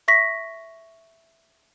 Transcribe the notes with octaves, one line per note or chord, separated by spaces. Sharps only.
E5 C#6 A#6 B6